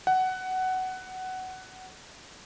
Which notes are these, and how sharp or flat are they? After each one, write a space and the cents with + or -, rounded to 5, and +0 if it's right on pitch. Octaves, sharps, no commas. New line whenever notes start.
F#5 +15